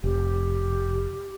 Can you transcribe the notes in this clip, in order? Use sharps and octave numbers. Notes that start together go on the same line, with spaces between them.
F1 G4